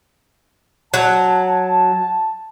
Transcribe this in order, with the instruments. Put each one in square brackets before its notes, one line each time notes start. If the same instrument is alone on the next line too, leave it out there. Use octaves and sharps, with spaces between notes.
[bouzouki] F#3 [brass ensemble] A5